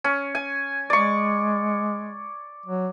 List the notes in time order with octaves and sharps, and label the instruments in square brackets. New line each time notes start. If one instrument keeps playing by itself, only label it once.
[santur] C#4
G#5
[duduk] G#3 [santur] D5 C#6
[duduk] F#3